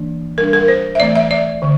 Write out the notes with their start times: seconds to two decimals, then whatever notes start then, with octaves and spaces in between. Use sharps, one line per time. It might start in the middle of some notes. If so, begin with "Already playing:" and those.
Already playing: E3 A#3 D4
0.38 G3 A#4
0.41 D4
0.53 A#4
0.68 C5
0.95 E5
1.00 E3 A3 C4 D5
1.15 E5
1.31 D5
1.62 D3